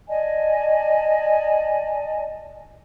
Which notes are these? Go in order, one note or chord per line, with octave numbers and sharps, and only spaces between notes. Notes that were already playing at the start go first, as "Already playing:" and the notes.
D5 D#5 G#5 A5